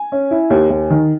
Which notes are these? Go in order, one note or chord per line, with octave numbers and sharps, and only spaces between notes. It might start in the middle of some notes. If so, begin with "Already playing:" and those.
Already playing: G#5
C#4
E4
D#2
D#2
D#3